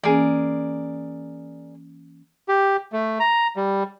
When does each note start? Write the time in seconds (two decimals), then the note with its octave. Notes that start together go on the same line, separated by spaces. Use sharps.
0.04 E3 A#3 C#4 G#4 A#4 D5
2.48 G4
2.92 A3
3.20 A#5
3.56 G3